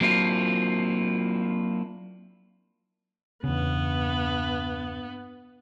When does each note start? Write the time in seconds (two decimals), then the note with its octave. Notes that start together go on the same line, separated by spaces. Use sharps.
0.01 F#3 A#3 C4 D4 E4 F4
3.44 E2 G2 C#3 B3